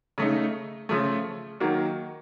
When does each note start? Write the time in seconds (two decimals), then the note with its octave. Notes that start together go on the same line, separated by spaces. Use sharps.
0.18 C#3 A3 D#4
0.89 C#3 F3 A3
1.60 D#3 F#3 A#3